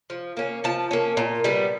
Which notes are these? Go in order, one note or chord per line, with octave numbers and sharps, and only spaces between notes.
F3
A#3 C#4
F3 A5
A#3 C#4
A#2
G3 B3